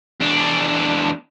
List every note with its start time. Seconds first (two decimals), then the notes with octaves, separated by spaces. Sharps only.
0.21 E2 D4